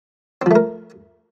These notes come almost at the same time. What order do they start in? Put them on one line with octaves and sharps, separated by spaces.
C4 F3 A3 A#4